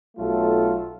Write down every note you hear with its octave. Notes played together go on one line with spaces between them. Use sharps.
B1 F#3 A3 F4 A4